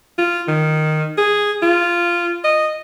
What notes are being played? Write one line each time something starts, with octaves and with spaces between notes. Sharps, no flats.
F4
D#3
G#4
F4
D#5